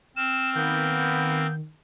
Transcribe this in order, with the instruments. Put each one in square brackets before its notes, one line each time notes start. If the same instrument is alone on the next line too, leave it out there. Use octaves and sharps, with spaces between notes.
[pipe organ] C4 F6 [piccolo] E7
[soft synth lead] D#3 [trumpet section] A#3 B3 [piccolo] G6